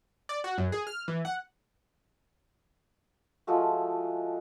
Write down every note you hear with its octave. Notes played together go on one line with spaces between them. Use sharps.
D5
F#4
F#2
G#4
F6
E3
F#5
F3 G#3 A3 F#4